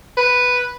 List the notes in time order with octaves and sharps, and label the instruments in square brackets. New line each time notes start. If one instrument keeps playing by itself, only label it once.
[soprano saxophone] B4